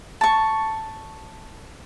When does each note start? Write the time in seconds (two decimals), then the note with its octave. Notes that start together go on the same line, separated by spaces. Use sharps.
0.21 A5 C#6